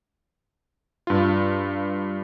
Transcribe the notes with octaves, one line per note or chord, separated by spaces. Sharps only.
G2 F4